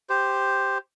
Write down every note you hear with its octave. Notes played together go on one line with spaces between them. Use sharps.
G4 C5